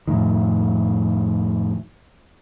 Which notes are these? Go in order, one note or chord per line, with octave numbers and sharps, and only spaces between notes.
F2 A2 D#3